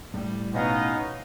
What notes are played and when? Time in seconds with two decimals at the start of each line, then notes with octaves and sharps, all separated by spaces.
0.14 A2 G3
0.54 B2 B3 C#4 D#4 D#5 F5